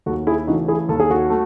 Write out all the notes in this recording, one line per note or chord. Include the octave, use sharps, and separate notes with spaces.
D#2 F#4 A4
E4 G#4
C#3 E3 A3 D#4 F#4
E4 G#4
D#2 A4
G#4
F#4 A4
A3